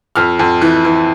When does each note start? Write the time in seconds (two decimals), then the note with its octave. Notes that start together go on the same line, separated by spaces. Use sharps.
0.16 F2 F6
0.39 F2
0.62 E3
0.85 E3